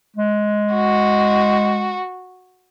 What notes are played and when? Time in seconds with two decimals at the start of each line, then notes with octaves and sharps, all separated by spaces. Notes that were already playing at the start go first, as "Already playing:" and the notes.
0.17 G#3
0.74 F#4